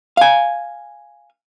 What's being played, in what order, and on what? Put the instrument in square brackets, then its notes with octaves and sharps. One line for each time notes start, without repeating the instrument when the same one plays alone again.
[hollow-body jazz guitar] F5 G#5